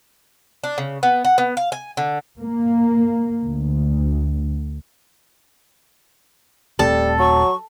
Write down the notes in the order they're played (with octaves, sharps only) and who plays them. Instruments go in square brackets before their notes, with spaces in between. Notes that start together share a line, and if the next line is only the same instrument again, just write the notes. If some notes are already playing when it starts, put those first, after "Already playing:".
[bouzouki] D4
C#3
B3
F#5
B3
F5
G#5
D3
[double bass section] A#3
D2
[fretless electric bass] D#1 A3 C4 [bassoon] G3 [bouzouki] A4
[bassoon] F#3 [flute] C#6